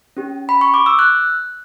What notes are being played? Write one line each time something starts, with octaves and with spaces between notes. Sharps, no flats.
C#4 G4
B5
C#6
D6
E6
F#6